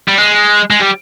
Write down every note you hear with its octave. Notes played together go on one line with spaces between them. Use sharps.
G3
G#3
G#3
G3